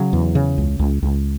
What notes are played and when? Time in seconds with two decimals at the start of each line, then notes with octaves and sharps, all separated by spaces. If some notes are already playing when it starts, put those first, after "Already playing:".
Already playing: C#3 F#3
0.13 E2
0.35 C#3
0.58 C#2
0.79 C#2
1.02 C#2